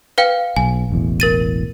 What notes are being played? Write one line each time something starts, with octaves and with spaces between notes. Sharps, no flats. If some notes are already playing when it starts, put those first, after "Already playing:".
B4 F5 G5
B1 G#5
E1 A1 E2
A#4 A6 D#7